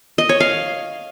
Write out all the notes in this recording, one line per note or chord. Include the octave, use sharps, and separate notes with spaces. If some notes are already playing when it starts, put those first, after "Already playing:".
D#5
C#5
F5